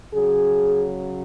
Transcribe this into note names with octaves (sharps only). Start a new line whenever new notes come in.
C#3 F#3 G#4